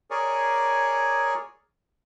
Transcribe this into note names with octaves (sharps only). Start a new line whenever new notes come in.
G#4 A#4 C#5 D5 G#5